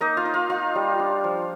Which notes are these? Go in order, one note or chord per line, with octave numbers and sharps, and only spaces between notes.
A#3 D#4 D#5
F4 F5
D#4
F4 F5
D#4 F4 F5
G3
D4
F3